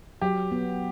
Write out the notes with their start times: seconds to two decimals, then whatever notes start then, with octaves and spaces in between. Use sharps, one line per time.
0.22 F#3 G4
0.52 B3